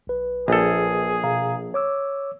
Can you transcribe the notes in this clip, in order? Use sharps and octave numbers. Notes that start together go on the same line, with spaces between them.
B1 B4
A#1 G#4 A4
B2 F5 A#5
C#5 D6 E6